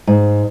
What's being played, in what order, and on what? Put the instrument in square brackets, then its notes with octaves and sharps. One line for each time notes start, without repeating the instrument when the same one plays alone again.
[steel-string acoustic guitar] G#2